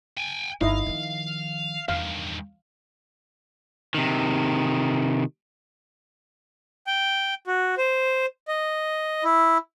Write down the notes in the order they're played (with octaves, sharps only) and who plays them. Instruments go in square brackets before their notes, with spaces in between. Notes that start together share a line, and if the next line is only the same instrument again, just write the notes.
[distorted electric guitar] G5 G#5
[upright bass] G1 [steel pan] D#4 E4 D#5 [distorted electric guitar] F5
[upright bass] D#3 F3
[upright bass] E2 [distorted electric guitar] G2 D#3 [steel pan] F5
[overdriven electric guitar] C3 D#3
[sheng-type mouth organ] G5
F#4
C5
D#5
E4